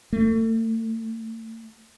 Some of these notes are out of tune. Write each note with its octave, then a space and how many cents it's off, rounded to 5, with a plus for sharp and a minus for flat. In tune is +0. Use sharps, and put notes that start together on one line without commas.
A3 +40